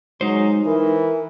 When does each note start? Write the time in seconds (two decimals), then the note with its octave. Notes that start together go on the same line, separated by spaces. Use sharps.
0.21 F#3 G#3 D#4 C5
0.66 E3 A#4